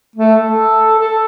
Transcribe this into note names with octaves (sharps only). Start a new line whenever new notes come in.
A3
A4
A4